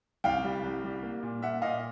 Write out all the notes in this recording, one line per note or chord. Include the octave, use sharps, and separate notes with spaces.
C2 F5 G5
G3
C2
G3
A#3
A#2
A#3 E5 F#5
A#2 D#5 F5